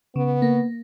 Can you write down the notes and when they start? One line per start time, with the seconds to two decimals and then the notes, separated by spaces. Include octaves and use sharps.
0.16 C#3 B3
0.42 A#3